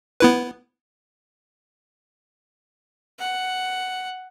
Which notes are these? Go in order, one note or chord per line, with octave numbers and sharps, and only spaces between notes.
B3 E4 B4
F#5